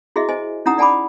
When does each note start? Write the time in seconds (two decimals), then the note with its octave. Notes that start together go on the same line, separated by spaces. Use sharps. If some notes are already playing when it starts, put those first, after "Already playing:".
0.16 E4 F#4 G#4 D#5 E5
0.29 C5 D#5 G#5
0.66 C#4 D#4 E4 F#5 A#5 D#6
0.78 D5 F#5 G#5 A5 B5 D6